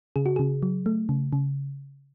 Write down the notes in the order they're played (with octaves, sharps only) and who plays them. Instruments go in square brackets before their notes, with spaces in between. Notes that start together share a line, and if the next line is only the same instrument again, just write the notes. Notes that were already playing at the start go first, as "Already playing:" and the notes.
[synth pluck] C#3 G#4
F#4
C#3 G#4
F#3
A3
C#3
C#3